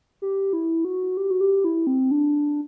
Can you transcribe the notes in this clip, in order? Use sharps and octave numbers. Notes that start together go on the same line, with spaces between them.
G4
E4
F#4
G4
F#4
G4
E4
C4
D4